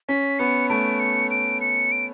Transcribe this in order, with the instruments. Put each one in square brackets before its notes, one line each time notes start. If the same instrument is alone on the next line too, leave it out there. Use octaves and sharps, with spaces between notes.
[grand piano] C#4 [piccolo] B6
[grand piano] B3 [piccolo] C#7
[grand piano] A3 [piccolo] D7
[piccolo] C#7
D7
C#7
D7